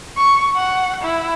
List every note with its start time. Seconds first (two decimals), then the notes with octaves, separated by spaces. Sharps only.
0.17 C#6
0.56 F#5
1.02 E4